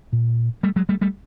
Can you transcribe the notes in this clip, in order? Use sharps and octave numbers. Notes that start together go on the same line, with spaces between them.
A#2
G3 A3
F#3 G#3
G3 A3
G3 A3